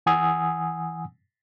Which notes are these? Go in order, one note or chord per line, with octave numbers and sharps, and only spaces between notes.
E3 F#5 G#5 D#6 E6